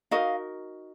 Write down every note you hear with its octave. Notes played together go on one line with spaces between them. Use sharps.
D#4 F#4 A#4 D#5 F5